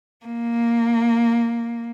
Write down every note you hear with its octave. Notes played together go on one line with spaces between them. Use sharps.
A#3